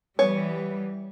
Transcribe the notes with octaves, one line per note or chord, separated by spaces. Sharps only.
E3 G3 B3 C#5